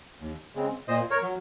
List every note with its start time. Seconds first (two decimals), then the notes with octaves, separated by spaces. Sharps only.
0.21 D#2
0.55 C#3 G#3 C4
0.88 A#2 C5 D#5
1.11 A#4 C#5
1.22 F#3